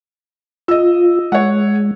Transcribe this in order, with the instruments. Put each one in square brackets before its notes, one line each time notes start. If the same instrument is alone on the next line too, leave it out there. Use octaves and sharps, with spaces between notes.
[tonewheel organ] F4 [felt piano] D#5 E6
[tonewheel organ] G#3 [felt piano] C#5 F#5